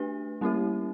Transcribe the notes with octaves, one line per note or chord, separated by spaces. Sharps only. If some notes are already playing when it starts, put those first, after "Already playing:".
Already playing: A3 D4 G4 B4
G3 A#3 C#4 E4 G4